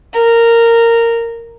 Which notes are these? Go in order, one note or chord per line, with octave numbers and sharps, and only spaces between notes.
A#4